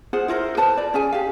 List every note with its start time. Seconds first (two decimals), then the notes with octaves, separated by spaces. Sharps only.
0.13 F4 G#4 C5 F#5
0.28 E4 F4 A#4 C5
0.57 B4 C5 A5
0.77 D5
0.94 C#4 G#4 G#5
1.13 G4 F5